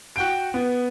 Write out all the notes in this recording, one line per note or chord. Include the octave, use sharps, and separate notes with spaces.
F#4 G5 D7
B3